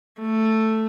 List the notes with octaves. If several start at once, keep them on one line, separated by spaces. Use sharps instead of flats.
A3